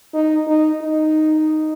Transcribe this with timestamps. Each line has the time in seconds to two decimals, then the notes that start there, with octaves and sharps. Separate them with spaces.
0.14 D#4
0.48 D#4
0.82 D#4